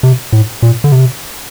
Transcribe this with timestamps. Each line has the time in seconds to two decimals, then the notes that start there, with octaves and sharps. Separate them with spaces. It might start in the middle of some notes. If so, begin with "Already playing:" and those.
0.03 C3
0.33 A2
0.62 A#2
0.84 D3
0.92 C3